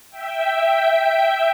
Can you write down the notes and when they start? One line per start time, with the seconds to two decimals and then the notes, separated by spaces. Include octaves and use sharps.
0.10 E5 G5